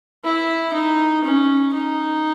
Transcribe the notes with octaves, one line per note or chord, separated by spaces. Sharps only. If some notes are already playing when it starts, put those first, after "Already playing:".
E4
D#4
C#4
D#4